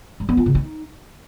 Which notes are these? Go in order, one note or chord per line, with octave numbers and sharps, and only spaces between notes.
G3
B3
F4
C#3
D#4